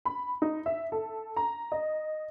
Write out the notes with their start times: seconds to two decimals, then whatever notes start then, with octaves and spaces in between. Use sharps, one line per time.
0.05 B5
0.42 D#4
0.66 E5
0.92 A4
1.36 A#5
1.72 D#5